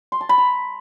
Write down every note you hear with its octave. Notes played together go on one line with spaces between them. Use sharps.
C6
A5
B5
A#5